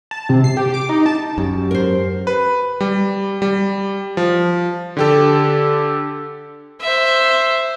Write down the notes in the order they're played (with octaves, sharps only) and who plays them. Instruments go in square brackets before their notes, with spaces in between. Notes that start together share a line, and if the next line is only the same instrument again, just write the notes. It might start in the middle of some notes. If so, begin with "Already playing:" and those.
[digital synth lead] A5
C3
C7
G4
D6
D#4
A5
[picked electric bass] F#2 [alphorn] G4
[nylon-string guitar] A#4 C5
[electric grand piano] B4
G3
G3
F3
D3 G4 A4
[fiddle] C5 E5